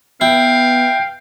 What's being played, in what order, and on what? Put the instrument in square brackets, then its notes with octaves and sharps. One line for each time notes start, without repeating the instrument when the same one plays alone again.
[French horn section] B3 [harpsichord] E4 [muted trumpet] F5 [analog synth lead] G5